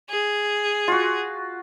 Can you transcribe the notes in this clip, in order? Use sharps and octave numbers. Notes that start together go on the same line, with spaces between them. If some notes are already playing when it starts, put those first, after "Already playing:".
G#4
F4 F#4